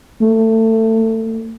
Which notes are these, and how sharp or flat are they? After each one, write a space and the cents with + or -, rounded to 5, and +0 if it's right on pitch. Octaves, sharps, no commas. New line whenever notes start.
A3 +25